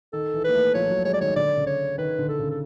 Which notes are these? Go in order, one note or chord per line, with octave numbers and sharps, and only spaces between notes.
D#3 A4
E3
A#3 B4
A3
F3 C#5
F3
F#3
G#3 C#5
D5
D#3 C#5
D3 D5
C#3
C#5
D#3 B4
D3
A4
C#3
A4